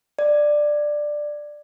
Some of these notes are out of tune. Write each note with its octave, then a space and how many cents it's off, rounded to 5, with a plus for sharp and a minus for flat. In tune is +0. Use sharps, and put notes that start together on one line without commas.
D5 +10